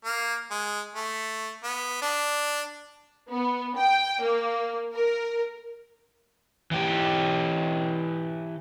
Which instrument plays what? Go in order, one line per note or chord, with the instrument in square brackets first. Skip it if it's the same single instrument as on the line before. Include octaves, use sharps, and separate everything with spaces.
[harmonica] A#3
G#3
A3
B3
D4
[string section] B3
G5
A#3
A#4
[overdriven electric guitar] E3 G4